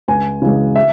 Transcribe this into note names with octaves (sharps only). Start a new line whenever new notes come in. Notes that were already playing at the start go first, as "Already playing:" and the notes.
C#2 G#5
C#3 E3 G#3
E5